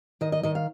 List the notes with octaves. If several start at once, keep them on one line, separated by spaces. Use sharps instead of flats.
D#3 D#5
D#5
D#3 D#5
F5